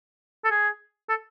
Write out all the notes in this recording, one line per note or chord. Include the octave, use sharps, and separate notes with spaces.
A4
G#4
A4